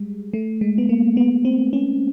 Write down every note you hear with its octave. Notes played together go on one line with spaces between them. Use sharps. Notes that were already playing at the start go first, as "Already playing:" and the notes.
Already playing: G3 G#3
A3
G#3
B3
A#3
B3
C4
C#4